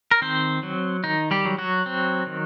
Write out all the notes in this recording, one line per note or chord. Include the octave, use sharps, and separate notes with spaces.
A#4
D#3 C4 C5
F#3
D#3 D#4
G3 G4
F#3
F#3 F#4
C4
D#3